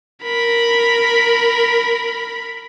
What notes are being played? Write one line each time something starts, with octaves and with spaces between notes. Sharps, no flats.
A#4 B5